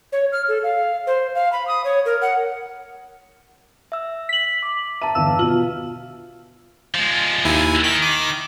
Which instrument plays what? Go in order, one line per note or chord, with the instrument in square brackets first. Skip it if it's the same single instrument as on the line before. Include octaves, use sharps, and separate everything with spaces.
[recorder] C#5
F6
A4
F5
C5
F5
B5
D#6
C#5
A#4
F#5
[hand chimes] E5 E6
[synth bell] B6 F#7
[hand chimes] D6
[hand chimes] E5 A5 [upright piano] A#5 D#7
[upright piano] G1 E2 [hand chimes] F5 [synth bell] E6
[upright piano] B2 F#7 [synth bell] F4
[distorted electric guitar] F3 G#3
[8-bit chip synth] D#2 E4 G#5
[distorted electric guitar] D#3 [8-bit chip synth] B6
[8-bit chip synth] D6